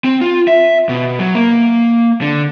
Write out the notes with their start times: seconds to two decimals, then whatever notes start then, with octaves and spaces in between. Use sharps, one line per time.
0.04 C4
0.21 F4
0.48 E5
0.89 B2
1.19 F#3
1.35 A#3
2.21 D3